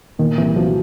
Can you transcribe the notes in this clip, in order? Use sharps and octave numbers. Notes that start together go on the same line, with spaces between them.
A#2 D#3
C2 E3
F3 F#3